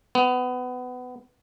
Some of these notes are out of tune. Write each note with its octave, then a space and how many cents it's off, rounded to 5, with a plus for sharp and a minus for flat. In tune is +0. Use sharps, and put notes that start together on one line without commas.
B3 +20